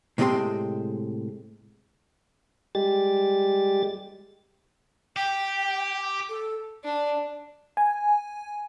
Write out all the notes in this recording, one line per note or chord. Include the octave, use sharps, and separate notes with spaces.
A2 C3 G#3 C4 G5 C6
G3 G#3 G4 A6
G4 G5
A4
D4
G#5